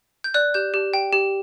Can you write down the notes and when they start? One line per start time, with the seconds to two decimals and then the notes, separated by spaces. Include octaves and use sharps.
0.24 G6
0.34 D5 F#6
0.54 G4 G6
0.74 G4
0.94 G5
1.13 G4